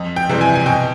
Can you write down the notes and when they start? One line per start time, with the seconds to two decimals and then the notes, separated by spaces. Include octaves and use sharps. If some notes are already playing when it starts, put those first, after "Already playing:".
Already playing: F2
0.16 G5
0.29 C3 E3 G3
0.41 G#5
0.55 G#5
0.66 B2 G5